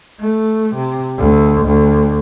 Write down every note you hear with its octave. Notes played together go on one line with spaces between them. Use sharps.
A3
C3
D2
D2